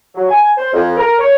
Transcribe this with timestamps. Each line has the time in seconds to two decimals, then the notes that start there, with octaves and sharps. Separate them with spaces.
0.15 F#3
0.29 G#5
0.57 C5
0.73 F2
0.97 A#4
1.19 C#5